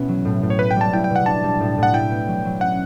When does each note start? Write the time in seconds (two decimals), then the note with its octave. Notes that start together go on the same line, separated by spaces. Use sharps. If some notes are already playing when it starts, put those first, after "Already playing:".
Already playing: B2 B3 C#4 E4
0.09 F#3
0.25 A2
0.42 A2
0.50 C#5
0.59 B3 B4
0.71 G5
0.76 G3 A5
0.93 E4 G5
1.04 G5
1.10 B2
1.16 F#5
1.26 D4 A5
1.43 G3
1.60 A2
1.77 A2
1.83 F#5
1.94 E4 G5
2.11 B3
2.28 F#3
2.45 F#3
2.61 C#4 F#5